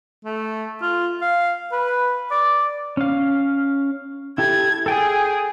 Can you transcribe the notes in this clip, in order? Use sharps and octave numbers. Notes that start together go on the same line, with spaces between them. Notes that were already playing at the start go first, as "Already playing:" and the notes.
A3
F4
F5
B4
D5
C#4 F5
E4 G4 A4 G#6
G#4 A4 G5 G#5